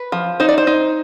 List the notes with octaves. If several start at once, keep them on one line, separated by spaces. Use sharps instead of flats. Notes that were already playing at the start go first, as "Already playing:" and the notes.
Already playing: B4
F3
D#4 C5
D5
C5
D#4